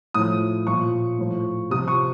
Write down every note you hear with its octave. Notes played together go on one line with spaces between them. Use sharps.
A2 F3 D#6
A#2 F3 C#6
A2 F3
C3 F3 D#6
C#6